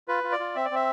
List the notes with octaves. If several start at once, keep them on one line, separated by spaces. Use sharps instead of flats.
F4 B4
F4
D5
F4
C4 E5
D5
C4 E5